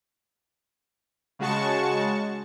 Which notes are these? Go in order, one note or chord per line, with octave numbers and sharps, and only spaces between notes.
C#3 G#3 F#4 A5 C#6